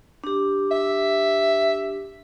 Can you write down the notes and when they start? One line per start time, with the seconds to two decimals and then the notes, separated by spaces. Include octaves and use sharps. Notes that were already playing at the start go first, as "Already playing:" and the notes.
0.24 D4 G4
0.71 E5